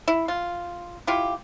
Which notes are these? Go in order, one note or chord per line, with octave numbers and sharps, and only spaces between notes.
E4
F4
E4 F4 G4